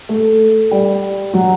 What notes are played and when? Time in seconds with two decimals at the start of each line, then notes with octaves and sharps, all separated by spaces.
0.09 A3
0.71 G3
1.34 F#3